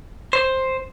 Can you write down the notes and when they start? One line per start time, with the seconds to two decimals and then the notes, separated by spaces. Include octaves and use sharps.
0.33 C5